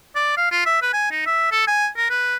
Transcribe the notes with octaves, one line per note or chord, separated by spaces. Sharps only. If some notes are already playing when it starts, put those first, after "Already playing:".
D5
F5
F4
E5
B4
G#5
D#4
E5
A4
G#5
A#4
B4